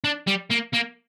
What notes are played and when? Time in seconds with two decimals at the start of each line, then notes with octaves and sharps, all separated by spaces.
0.04 D4
0.27 G3
0.50 A#3
0.73 A#3